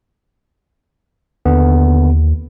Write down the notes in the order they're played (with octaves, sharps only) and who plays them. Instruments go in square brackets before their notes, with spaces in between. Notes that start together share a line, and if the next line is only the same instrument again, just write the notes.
[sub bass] D#2 [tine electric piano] D3 B3